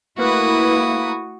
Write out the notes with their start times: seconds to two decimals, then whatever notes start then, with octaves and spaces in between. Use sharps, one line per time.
0.18 A3 A#3 E4 F#4 B4 D#6